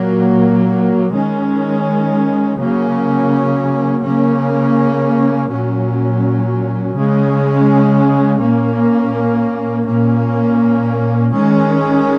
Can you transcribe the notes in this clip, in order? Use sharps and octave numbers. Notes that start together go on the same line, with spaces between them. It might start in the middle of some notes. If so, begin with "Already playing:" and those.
Already playing: A#2 F#3 A#3
D#3 G#3 C#4
C#3 F#3 A#3 C#4
C#3 A#3 C#4
A#2 F#3 C#4
C#3 G#3 C#4
A#2 A#3 C#4
A#2 A#3 C#4
D#3 G#3 C#4